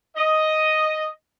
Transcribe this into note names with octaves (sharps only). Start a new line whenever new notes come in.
D#5